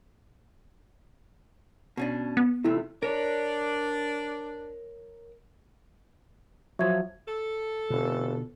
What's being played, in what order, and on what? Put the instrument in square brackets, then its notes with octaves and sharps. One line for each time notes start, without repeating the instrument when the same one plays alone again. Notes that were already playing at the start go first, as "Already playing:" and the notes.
[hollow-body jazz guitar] B2 C#4 D4
[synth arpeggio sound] B3
[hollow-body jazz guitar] E2 C3 A3 [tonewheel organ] E4
[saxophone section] D4 [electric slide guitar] A#4 C#5
[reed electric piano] F3 F#3 [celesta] E5 G#6
[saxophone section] A4
[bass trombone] F1 [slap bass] B2 D3